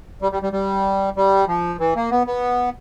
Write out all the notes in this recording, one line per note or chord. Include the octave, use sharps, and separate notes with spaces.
G3
G3
G3
G3
G3
F3
E3
A#3
B3
B3